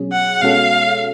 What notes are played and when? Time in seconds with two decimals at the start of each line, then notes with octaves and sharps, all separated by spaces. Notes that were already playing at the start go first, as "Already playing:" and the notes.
Already playing: B2 F#3 C#4 G#4
0.13 F#5
0.42 B2 G#3 C#4 F#4 A4 F5